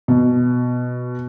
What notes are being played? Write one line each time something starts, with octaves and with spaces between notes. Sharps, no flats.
B2